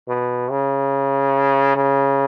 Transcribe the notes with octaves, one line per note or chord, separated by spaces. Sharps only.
B2
C#3
C#3